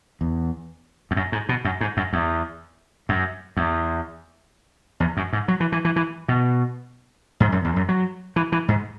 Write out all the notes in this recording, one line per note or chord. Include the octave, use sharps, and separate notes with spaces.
E2
E2
F#2
G#2
B2
F#2
G#2
F#2
E2
F#2
E2
E2
F#2
G#2
F#3
E3
E3
E3
E3
B2
G#2
F#2
E2
F#2
F#3
E3
E3
G#2